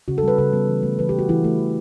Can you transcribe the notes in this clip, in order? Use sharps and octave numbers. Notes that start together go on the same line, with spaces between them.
C#3 F#4
A4
G3 B3 B4
C#3 A4
G3 B3
E3
A3
E3 B4
G4
A3 F#4
E3 E4
A3
E3